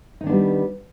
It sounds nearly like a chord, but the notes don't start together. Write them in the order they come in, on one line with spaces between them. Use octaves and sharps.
D#4 D#3 D4 B3 G3